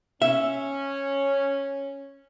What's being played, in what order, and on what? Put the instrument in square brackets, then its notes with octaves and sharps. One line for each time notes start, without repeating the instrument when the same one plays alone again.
[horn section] C#4 [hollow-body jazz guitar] E5